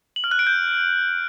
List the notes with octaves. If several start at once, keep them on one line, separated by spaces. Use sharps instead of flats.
F#7
F6
F#6
D7
G6